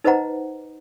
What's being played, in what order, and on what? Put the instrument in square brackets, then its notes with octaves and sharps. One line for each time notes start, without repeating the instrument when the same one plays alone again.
[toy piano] D#4 B4 C5 D#5 F#5 A#5